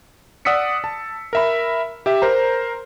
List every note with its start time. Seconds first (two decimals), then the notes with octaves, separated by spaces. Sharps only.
0.45 D5 F#5 D#6 E6 B6 C#7
0.84 A5
1.33 A#4 E5 B5
2.06 G4 E5
2.22 A#4 C5 A#5